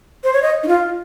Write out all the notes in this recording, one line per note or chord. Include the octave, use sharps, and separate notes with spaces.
C5
C#5
D#5
D#4
F4